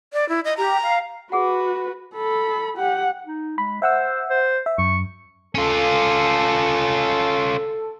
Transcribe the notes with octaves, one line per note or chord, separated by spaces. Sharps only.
D5
E4
D#5
G4 A#5
F5
F#4 G#4 B4 F#5
A4 B5
G4 F#5
D#4
G#3 B5
C5 E5 F#5 E6
C5
E5
F#2 C#6
C#4 F4 A4